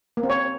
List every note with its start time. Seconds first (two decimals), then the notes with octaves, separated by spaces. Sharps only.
0.17 A#3
0.23 C4
0.30 C#5